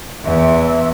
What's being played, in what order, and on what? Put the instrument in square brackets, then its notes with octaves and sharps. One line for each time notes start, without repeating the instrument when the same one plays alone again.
[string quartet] E2 [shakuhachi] E5